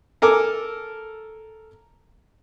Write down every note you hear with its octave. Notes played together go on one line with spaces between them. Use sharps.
A4 A#4 G#5 D6